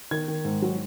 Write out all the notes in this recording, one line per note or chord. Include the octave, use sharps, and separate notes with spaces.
D#3 G#6
D#3
G#2
F#3